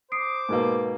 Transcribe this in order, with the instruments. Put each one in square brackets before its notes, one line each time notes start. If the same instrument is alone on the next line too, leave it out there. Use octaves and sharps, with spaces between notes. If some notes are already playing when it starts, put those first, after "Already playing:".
[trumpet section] C5 D6 [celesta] D#6 C7 D7
[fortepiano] G#2 B2 A#3 [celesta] A#4 B4